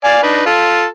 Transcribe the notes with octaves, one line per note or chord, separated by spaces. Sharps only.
D5 F5 G#5
D4 D#4 B4
F4 A4